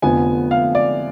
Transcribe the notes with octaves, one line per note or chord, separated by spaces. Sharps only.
F1 F2 D3 F3 B3 G#5
F5
D5